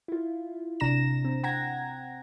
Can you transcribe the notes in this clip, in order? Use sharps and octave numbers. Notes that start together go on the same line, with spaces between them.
E4 F4
A1 C3 D4 A#5 A#6 E7
C4
F#5 G5 A#5 G#6 A#6